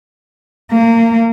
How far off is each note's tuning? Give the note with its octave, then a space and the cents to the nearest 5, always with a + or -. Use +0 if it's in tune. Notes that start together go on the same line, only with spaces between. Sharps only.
A#3 -25